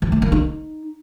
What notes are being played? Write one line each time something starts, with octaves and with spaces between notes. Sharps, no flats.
E3
A3
A#3
D#4